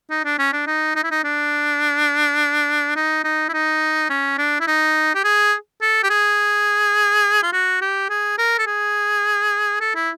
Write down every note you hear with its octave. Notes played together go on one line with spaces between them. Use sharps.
D#4
D4
C#4
D4
D#4
D#4
E4
D#4
D4
D#4
D#4
E4
D#4
C#4
D4
E4
D#4
G4
G#4
A4
G4
G#4
F4
F#4
G4
G#4
A#4
A4
G#4
A4
E4